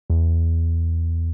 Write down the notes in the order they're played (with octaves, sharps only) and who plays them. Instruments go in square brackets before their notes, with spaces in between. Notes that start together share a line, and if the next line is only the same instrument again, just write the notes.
[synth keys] E2